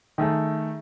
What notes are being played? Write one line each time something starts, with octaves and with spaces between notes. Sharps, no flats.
D#3 A3 G#4